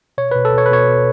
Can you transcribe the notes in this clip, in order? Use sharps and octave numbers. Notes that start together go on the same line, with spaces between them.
B2 C#5
B2 B4
A4
B2 C#5
B4
B2 C#5
B2